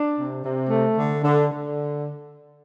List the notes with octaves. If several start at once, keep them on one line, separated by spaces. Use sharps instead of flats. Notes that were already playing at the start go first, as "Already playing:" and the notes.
Already playing: D4
C3
C3
A3
D3
D3
D3